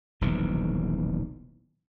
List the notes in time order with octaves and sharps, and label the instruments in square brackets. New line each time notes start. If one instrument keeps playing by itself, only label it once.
[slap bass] D#1 B1 C3 E3